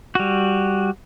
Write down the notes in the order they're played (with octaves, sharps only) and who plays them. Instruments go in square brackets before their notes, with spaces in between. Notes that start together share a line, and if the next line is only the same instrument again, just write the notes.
[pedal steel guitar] G3 F#4